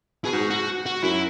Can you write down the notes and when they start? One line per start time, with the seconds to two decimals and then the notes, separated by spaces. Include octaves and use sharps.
0.25 B2 G#4
0.33 G#2 F#4
0.50 F#4
0.86 F#4
1.03 F#2 E4